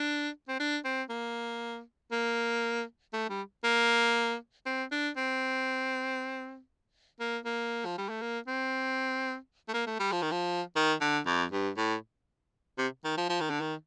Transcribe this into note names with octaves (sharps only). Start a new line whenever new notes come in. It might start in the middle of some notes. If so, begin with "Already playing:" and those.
Already playing: D4
C4
D4
C4
A#3
A#3
A3
G3
A#3
C4
D4
C4
A#3
A#3
F3
G3
A3
A#3
C4
A3
A#3
A3
G3
F3
D#3
F3
D#3
D3
F2
G2
A2
C3
D#3
F3
F3
D#3
D3
D#3